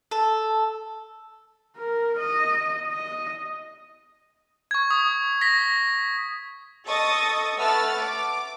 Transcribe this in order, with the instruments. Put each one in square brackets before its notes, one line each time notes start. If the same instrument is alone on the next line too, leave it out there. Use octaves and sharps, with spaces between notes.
[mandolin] A4
[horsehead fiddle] A#4
D#5
D#5
[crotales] C#6 G#6
D#6
A#6 B6
[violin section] A4 D#5 C#6 D#6 A6
A3 B4 F#5 E6 F6 A6
D6